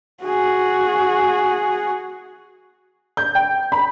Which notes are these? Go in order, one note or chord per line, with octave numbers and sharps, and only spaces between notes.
F#4 G#4
G6
G5
B5